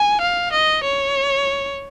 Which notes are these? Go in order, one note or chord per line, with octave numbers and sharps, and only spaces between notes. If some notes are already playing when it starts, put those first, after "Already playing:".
Already playing: G#5
F5
D#5
C#5